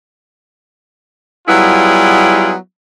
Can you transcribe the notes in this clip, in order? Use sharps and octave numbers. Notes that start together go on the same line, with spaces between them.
F#3 G3 B3 E4 F4 G#4